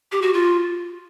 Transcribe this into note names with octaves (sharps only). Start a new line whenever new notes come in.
G4
F#4
F4